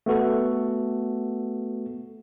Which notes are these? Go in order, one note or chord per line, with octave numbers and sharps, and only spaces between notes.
A3 B3 F#4 A4